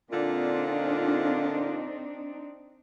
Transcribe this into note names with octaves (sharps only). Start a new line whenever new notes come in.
A#2 D3 C4 D4 D#4 F4